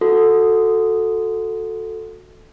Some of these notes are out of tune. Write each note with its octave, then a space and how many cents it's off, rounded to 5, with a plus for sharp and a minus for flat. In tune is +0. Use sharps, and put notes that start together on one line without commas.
F#4 -20 A4 +0